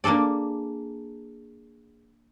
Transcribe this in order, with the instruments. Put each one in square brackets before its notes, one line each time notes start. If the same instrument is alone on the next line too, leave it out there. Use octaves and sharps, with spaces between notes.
[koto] A#3 D4 G#4 A4 D5